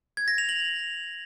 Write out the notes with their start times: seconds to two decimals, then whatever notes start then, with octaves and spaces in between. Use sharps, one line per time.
0.17 G#6
0.28 A#6
0.38 F7
0.49 F#7